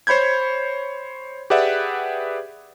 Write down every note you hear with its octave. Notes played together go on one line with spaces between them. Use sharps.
C5 C#5 B5 G6 G#6
G4 G#4 B4 D5 E5 F#5